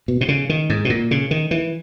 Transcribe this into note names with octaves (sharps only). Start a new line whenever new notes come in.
B2
B2
C#3
D#3
G#2
B2
A#2
C#3
D#3
E3